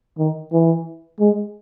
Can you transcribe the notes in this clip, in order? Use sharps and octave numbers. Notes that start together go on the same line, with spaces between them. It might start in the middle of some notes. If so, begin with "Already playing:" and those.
D#3
E3
G#3